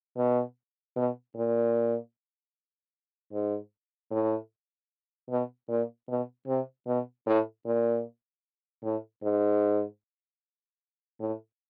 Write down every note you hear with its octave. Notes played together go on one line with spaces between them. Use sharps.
B2
B2
A#2
G#2
A2
B2
A#2
B2
C3
B2
A2
A#2
A2
G#2
A2